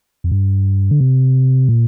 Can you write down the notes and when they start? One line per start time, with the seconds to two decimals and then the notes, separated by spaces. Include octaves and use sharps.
0.24 F2
0.31 G2
0.91 D3
1.00 C3
1.69 A#2